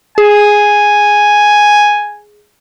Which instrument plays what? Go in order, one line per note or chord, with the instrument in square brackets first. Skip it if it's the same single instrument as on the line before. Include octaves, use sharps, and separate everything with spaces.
[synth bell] G#4 [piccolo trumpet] G#5